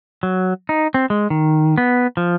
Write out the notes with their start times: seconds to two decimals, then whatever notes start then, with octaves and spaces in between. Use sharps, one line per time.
0.23 F#3
0.69 D#4
0.94 C4
1.10 G#3
1.30 D#3
1.78 B3
2.17 F3